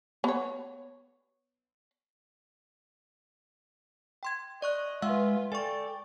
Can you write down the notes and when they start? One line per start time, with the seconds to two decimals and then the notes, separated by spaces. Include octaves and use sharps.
0.24 B3 C#5
4.23 G5 C6 G#6
4.62 D5 D#5 C#6 F#6
5.02 G#3 F4 B4 E5 F#5 E6
5.52 A4 D5 G5 G#5 C#6